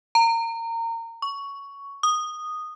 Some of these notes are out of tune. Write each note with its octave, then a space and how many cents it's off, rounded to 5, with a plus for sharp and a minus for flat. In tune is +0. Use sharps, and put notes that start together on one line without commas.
A#5 -25
C#6 +10
D#6 -10